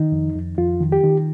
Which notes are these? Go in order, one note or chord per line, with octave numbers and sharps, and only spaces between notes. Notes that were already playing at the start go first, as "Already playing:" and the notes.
Already playing: D#3 D#4
F2
F2
F2 F4
D#3
G4
D#3